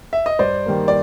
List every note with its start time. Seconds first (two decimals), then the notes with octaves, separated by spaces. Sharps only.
0.13 E5
0.26 D#5
0.39 G2 C5 D5
0.66 D#3 G3 A#3
0.88 D5